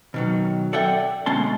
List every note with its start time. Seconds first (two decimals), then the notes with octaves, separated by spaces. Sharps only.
0.14 B2 D#3 F#3
0.73 A4 D5 E5 F#5 G5
1.26 D2 B2 G#3 C#4 A5 C6